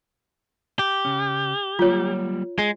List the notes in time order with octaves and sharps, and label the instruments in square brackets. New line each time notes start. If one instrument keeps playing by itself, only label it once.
[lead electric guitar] G4
[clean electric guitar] C#3 C#4
[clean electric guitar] F#3 G3 A#3 [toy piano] F4 C#5
[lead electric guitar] G#3 [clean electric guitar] G#4